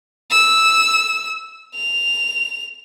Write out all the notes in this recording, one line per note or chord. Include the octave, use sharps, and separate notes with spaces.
E6
F7